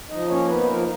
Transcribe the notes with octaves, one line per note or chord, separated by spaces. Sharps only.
F3 D#4 D#5
A#3 C#4 C#5
B3 D#4 B4
F3 A#3 A#4